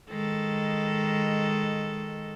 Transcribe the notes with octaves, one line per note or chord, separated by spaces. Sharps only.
D#3 G#3 A4